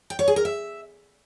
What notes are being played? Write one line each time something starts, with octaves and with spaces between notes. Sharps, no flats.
G5
C#5
G#4
A#4
E5